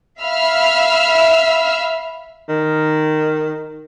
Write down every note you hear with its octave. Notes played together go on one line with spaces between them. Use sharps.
E5 F5 B5 E6 F6
D#3